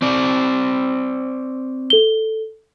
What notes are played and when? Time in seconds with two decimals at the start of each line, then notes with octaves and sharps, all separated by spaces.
0.02 C4 D5
1.90 A4 G7